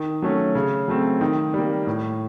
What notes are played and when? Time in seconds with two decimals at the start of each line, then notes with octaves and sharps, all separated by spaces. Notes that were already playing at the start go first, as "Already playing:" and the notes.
Already playing: D#3
0.22 F#3 A3 C#4
0.55 C#3
0.88 F#3 A3 C4
1.21 D#3
1.54 G3 A#3
1.87 A2